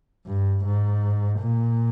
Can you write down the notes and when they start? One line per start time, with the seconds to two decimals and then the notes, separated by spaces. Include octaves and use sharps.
0.26 G2
0.64 G#2
1.40 A#2